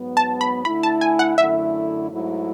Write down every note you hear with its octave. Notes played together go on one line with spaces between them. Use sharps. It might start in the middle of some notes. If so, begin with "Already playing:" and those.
Already playing: G#2 F#3 B3
A5
B5
D3 A3 E4 B5
A5
G#5
F#5
F#2 D3 A3 E4 E5
G#2 F#3 A3 E4